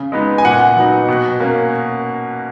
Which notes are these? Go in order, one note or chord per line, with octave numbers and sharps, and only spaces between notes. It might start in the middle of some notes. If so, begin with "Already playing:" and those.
Already playing: C#3
G#3 B3 D#4
G#5
A#2 F#5
F#3 B3 D#4
B2
A#3 C#4